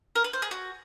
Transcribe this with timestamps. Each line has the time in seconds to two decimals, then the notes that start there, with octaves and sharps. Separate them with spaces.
0.16 A#4
0.24 B4
0.33 C5
0.42 G#4
0.51 F#4